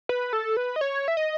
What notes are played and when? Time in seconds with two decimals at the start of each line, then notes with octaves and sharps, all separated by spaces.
0.09 B4
0.33 A4
0.57 B4
0.76 D#5
0.81 C#5
1.08 E5
1.17 D#5